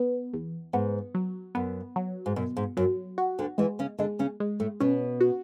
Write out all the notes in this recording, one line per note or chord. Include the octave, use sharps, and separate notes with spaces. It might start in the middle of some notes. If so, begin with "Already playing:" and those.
Already playing: B3
E2
G#2 B3
F#3
F#2 B3
F#3
G#2
F#2 B2
G#2
F#2 F#3
F#4
D2 D3
E2 E3 G#3
C#3 C#4
D3 G#3 D4
C#3 C#4
G#3
A2 A3
B2 B3 C#4
F#4